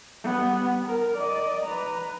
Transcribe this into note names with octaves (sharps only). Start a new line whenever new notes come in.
G3 B3
A#4
D5 D#5
B4 A#5